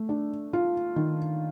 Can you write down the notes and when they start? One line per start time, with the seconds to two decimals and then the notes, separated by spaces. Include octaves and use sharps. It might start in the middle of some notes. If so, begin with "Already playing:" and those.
Already playing: A3
0.09 D4
0.53 F4
0.96 D#3